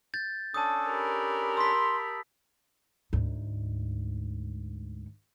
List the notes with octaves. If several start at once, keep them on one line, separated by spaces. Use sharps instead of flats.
G6 A6
C#4 D4 A4 A5 D#6
G4 A#4 B5
C6 E6 B6
D2 G#2